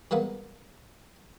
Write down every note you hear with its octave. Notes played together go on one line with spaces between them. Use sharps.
G3 G#3 A#3 B3